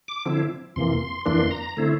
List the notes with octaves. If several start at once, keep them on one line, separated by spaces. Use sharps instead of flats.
D6
D3 F3 C4 E4
F2 C3 E3 A#3 C6
F2 E3 A#3 D4 C6
A#5
D3 A3 C4 E4